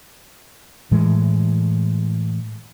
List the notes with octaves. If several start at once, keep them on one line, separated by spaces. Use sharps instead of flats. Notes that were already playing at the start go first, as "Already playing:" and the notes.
A2 E3 G#3